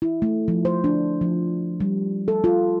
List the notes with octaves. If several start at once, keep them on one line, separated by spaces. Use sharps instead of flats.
E4
A3
F3
C5
D4
F3
G3
A4
F4